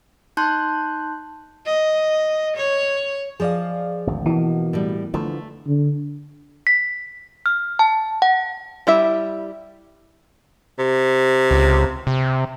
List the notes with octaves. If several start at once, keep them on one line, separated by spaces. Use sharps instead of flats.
D#4 A5 C6 F#6 G6
D#5
C#5
F3 F4 G#4 D5 D#5 F5
G#1 D2
B2 E3 A#3
A2 G3
D3 E3 F3 A3
D3
B6
F6
A5
F#5
G3 E4 E5
C3
C#2
C3